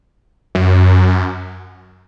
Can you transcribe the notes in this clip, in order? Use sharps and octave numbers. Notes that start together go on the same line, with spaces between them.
F#2